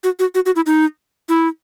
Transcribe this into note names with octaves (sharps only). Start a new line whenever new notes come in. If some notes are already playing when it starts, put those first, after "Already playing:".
F#4
F#4
F#4
F#4
E4
D#4
E4